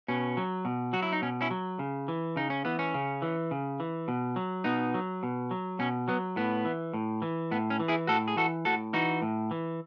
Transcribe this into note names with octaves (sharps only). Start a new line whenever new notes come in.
B2 C#4
F#3
B2
F#3 F#4
E4
D#4
B2 C#4
C#4 E4
F#3
C#3
E3
C#3 D#4
C#4
E3 B3
C#4
C#3
E3
C#3
E3
B2
F#3
B2 B3 D#4
F#3
B2
F#3
B2 C#4
F#3 B3
A2 B3
E3
A2
E3
A2 B3
C#4
E3
E4 G#4
A2 F#4 A4
G#4
E3 F#4 A4
A2 F#4 A4
E3 D#4 F#4
A2
E3